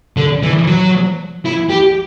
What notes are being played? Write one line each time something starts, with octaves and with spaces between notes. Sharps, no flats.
D3
E3
F#3
E4
G4